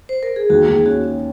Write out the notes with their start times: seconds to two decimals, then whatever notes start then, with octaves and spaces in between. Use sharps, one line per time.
0.09 C5
0.23 A#4
0.36 G#4
0.50 D#2 F#4
0.68 D#2 G#4
0.86 C#4 F#4